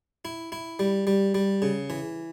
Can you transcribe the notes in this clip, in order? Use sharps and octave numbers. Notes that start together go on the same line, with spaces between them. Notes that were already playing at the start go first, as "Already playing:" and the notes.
E4
E4
G3
G3
G3
C#3
E3